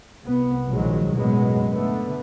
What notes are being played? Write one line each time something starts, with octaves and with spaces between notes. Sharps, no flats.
C2 B3
A#1 D#3 F#3 G#3
A1 F#2 B2 F#3 G#3 B3
D3 A3 B3